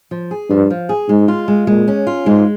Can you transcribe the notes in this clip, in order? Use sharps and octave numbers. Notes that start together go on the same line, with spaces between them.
F3
G#4
G2 F3
F3
G#4
G#2 G#3
F4
G#3
A#2 G#3
C#4
F4
G#2 G#3